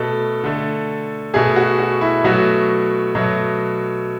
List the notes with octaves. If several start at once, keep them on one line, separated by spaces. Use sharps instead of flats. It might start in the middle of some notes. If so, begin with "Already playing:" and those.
Already playing: B2 A3 A4
D3 A3
B2 A3 G#4
F#4
F#4
E4
B2 F#3 A3 F#4
B2 F#3 A3